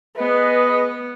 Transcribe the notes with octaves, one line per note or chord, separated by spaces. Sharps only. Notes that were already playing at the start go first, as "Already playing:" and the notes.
B3 G#4 B4 D#5